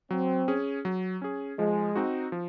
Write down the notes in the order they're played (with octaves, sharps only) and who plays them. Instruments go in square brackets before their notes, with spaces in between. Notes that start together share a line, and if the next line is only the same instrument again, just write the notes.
[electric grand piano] F#3 [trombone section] C4
[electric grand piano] C#4 G#4
F#3
C#4 G#4
[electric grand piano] F3 [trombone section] G#3
[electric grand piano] C4 D#4 F#4
F3